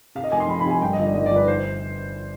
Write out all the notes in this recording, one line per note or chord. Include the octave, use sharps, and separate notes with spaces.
C3 F5
D#5
F1 G#5
C6
F2 B5
B5
C3 G#5
G2 G5
D#5
G1
D5
G1 D#5
D5
G1 B4
C5